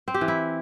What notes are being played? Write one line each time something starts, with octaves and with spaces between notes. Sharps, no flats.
C4
G4
E3
E4